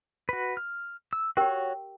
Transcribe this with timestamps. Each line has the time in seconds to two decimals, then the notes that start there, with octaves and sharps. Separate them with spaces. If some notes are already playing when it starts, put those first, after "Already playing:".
0.29 F#4 B4
0.57 F6
1.13 E6
1.37 F#4 G4 A#4 C#5 G5